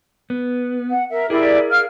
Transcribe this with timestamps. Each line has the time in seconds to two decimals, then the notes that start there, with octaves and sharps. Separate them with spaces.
0.30 B3
0.91 F#5
1.10 A#4 E5
1.30 E4 G4 G#4 A#4 D5
1.71 F5 F6